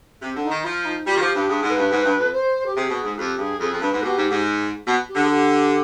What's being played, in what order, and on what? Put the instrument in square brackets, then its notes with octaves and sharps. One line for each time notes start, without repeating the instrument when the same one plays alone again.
[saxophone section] C3
D3
[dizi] D#4
[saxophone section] D#3
[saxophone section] F3 [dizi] F4
[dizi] D#4
[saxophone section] G3 [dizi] F4
[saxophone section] D#3
[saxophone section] F3 [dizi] G4
[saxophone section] G2 [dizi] G4
[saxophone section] G2 [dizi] G#4
[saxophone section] G#2
[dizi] B4
[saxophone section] G2
G#2
G2
F2
[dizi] C5
G4
[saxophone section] C3 [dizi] G#4
[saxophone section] B2
G#2
[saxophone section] F2 [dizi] G4
[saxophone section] G2 [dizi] G#4
[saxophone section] F2 [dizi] G#4
[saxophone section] F2
[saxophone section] G2 [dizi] B4
[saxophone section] G#2
[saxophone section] B2 [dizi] G4
[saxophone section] G#2
G#2
B2
[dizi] G4
[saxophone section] D3
[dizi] G#4
G4